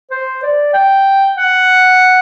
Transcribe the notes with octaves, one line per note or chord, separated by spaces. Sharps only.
C5
D5
G5
F#5